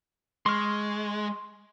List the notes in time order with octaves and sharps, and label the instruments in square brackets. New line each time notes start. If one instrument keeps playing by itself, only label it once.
[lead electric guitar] G#3 [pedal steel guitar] C6 C#6 F6